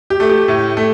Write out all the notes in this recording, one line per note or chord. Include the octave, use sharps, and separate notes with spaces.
G4
A3
G4
A2
A3